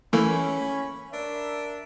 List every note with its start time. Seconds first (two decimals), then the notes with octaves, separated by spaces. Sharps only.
0.13 E3 A3 A#3 C#4 B5
1.12 D4 A#4 E5